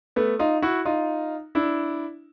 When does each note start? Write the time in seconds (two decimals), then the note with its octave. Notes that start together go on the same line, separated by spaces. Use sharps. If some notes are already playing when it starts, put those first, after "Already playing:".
0.16 A3 B3
0.39 D#4 F4
0.62 E4 F#4
0.85 D#4 F4
1.55 D4 E4